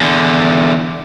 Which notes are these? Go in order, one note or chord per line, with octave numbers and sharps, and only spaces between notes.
E2 D3